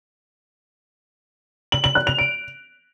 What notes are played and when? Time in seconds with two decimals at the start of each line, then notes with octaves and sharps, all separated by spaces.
1.72 F#7
1.84 F#7
1.95 F#6
2.07 F7
2.18 D7